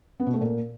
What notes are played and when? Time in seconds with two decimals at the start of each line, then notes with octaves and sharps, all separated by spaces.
0.20 B3
0.27 B2
0.34 A3
0.41 A#2